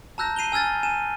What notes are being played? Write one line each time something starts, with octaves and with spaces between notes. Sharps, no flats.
A5 A#5 E6 F#6 G6 A#6
C7 D#7 F7 G7
G#5 E6 F6 G#6 A6
G#5 D#7 E7